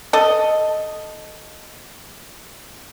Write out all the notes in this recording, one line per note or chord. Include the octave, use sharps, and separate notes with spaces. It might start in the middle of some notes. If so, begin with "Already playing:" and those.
A4 D#5